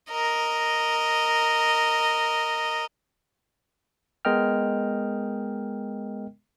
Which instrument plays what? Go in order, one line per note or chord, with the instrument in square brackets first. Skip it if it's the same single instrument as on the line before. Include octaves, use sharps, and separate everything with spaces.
[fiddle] A#4 D#5
[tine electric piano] G#3 B3 A#4 D#5 G5 F6